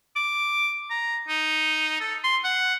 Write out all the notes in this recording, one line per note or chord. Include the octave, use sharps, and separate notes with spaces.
D6
A#5
D#4
A4
C6
F#5